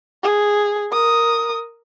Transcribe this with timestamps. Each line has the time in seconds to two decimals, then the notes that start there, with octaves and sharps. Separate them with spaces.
0.23 G#4
0.92 A#4 D#6